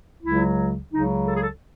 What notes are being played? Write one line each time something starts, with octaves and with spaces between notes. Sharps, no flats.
C#2 C#3 F#3 E4
C#2 C#3 F#3 D#4
A4
G#4
A4